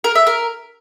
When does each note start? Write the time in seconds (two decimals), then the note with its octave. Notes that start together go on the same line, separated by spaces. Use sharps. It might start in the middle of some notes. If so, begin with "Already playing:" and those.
0.04 A#4
0.15 E5
0.27 A#4